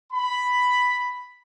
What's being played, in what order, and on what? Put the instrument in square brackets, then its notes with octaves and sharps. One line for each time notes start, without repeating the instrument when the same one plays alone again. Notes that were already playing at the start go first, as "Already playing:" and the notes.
[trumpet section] B5